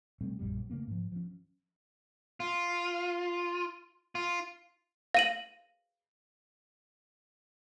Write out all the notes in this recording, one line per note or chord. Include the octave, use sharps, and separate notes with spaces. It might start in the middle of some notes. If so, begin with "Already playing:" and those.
B2 G3 A3 C4
A#1 F#2 G3
C#3 A3 A#3 C#4
G#2 F3
F3 C#4
F4
F4
F5 D#7 F#7